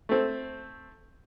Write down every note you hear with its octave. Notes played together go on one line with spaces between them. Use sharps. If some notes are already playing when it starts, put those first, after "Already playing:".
A3 C4